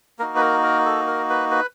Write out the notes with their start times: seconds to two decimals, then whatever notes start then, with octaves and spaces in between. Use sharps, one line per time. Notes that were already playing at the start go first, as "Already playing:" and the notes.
0.19 A#3 D#4 F#4 A#4
0.36 B4
0.41 A#4
0.63 A#4
0.85 A4
1.07 A#4
1.30 B4
1.51 B4